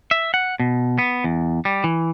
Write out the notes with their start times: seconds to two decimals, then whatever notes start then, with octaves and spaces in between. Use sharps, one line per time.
0.11 E5
0.34 F#5
0.60 B2
0.98 B3
1.24 E2
1.65 G3
1.84 E3